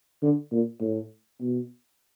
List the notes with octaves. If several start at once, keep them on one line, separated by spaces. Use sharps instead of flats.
D3
A#2
A2
B2